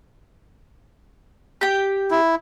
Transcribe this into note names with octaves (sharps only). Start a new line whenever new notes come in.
G4 G5
E4